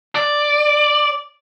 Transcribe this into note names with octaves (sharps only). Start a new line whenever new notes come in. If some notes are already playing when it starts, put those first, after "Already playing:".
D5